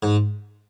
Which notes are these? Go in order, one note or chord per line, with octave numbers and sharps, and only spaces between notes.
G#2